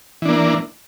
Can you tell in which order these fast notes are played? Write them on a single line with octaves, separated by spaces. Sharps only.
E3 D4 A#3